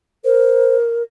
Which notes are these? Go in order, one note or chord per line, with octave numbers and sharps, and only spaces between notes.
A#4 C5